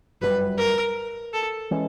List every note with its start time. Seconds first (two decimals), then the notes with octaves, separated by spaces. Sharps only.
0.21 G1 F#2 D3 B4
0.26 G3
0.58 A#4
1.33 A4
1.71 E3 G#3 C#4